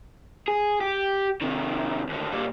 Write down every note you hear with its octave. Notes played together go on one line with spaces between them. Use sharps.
G#4
G4
C3 D#3
D#2 D3
A#2 G3